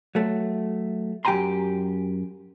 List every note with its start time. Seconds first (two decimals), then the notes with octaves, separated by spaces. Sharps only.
0.15 F#3 A3
1.25 F#2 G4 G5 G#5 A#5 C6